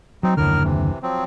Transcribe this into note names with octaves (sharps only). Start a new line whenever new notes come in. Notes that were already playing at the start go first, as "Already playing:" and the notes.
F#3 C4 D#4
F#1 D#2 A2 D3 A#4 F6
C3 E3
F3 F#3 C4